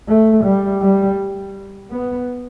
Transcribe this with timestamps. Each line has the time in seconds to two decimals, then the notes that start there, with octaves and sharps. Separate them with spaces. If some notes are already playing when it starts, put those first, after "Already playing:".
0.08 A3
0.44 G3
0.82 G3
1.91 B3